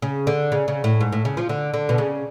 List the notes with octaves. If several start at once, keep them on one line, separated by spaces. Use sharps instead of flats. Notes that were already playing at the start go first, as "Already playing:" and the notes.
C#3
D3
C#3
C#3
A2
G#2
A2
C#3
F3
D3
D3
B2
C#3